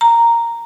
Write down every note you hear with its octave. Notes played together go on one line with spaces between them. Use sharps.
A#5